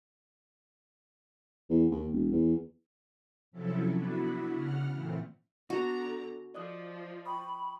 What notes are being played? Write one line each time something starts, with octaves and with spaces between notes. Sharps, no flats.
E2
D#2
E1
E2
C3 F3 F#3 C#4 E4 A4
B3 D4 E4 F#4 B4
C#3 F#5 F6
A#2 E3 A3 C4
D3 B3 F#4 A#5
D4
F3 D5 D#5 D#6
G5 B5 C#6 D#6